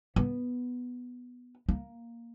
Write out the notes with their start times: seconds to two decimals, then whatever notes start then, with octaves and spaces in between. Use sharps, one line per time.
0.16 B3
1.69 A#3